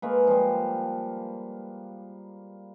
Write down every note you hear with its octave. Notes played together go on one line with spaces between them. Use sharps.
G#3 A#3 B4
F3 G3